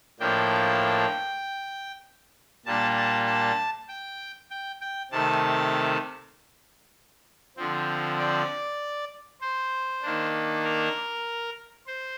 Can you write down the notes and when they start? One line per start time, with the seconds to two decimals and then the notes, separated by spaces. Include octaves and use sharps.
0.20 A2 F3 A#3 D4 G5
2.66 A#2 G3 A#3 D4 A5
2.96 A5
3.27 A5
3.88 G5
4.50 G5
4.81 G5
5.11 C3 D#3 A3 A5
7.57 D3 F3 C4
8.18 D5
9.41 C5
10.02 D#3 A#3 D4
10.64 A#4
11.87 C5